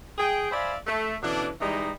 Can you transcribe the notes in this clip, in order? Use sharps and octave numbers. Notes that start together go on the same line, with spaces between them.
G#4 G5
C5 D5 E5 F5 G#5 B5
A3
B2 D3 E3 C#4 D4
E3 G3 G#3 D#4